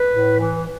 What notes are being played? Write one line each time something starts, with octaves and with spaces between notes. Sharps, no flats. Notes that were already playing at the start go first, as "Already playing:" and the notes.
Already playing: B4
A2
E3